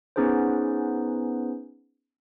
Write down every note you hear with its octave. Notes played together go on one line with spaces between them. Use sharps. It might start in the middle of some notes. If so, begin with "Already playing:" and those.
B3 C#4 D#4 G#4 B4 C5